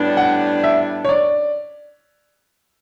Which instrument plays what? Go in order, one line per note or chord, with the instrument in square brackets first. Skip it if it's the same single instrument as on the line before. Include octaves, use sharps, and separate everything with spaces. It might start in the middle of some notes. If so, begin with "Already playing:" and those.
Already playing: [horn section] A2 G3 B3 D4
[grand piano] F#5
E5
C#5
D5